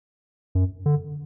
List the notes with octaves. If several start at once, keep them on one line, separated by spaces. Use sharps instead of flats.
F#2
D3